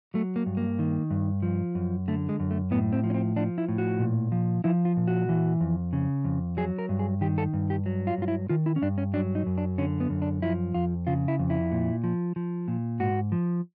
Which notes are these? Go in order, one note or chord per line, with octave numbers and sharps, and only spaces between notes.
F#3 A3
A#3
G2
A#3
D#3
G2
F3
F#2
D3 A3
G#3
F#2
A3
A2 B3
C4
F3
C#4
C4
F3 D4
E4
A2
F#4
A#2
F3
F3 E4
F4
A#2
F#4
E3
F2
C#3
F2
F#3 G#4
A#4
G2
G#4
D#3 G4
A4
G2
G4
F#3
F4
G2 F4
E4
D#3 F4
E4
C#4
G2 D4
C#4
F#3 D4
D#4
F#2
D4
D3 C#4
B3
F#2
D4
F3 E4
F2 F4
C#3 F4
E4
F2
E4
A#2
F3
F3
A#2
G#2 F#4
F3